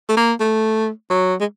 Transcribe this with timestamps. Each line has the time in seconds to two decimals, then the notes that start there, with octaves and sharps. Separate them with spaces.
0.09 A3
0.17 A#3
0.40 A3
1.10 F#3
1.40 G#3